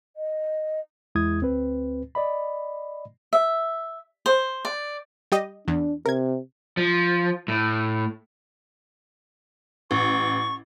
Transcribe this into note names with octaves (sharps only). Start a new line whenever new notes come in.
D#5
E2 G#3 E4 D#6 G#6
D2 C4 B4
D5 D#5 B5
E5
C5
D5
G3 G4 D#5
E2 D4
C3 A#4 G#6
F3
A2
A1 C#6